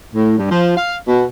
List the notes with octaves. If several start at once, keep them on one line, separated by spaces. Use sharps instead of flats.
A2
G2
F3
F5
B2